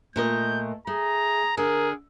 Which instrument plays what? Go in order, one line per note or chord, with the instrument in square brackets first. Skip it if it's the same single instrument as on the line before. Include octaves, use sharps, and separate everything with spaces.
[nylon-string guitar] A#2 A#4 D#5 [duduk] A3 [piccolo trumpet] G6
[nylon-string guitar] A3 [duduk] G#4 [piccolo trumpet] A#5
[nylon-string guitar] D3 [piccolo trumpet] G#4 [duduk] A#4